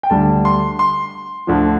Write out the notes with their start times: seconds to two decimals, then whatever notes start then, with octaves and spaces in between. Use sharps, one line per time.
0.03 G5
0.10 D2 D3 G3 A5
0.45 C6
0.79 C6
1.47 D2 D3 F3